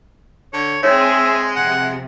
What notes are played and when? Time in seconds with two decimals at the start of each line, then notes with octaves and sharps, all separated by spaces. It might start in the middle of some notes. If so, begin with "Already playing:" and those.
0.53 D3 C#5
0.83 G#3 C4 D#4 G#4 C#5 E5
1.55 F2 C3 F#5